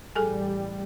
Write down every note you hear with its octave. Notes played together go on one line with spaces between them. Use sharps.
A1 G3 G#4 A4 G#5